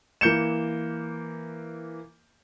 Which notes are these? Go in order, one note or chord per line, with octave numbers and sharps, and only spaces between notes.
E3 A#3 G6 C#7 E7